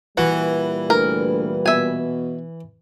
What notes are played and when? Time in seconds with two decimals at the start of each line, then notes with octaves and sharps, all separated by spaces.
0.17 A#2 E3 G3 F#4 B4
0.90 D2 A#4
1.66 B2 E5 G#5